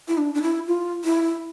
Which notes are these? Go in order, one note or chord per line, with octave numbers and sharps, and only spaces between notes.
E4
D4
D4
E4
F4
E4